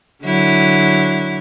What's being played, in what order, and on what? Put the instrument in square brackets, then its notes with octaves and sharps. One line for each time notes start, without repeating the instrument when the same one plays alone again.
[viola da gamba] D3 F#3 E4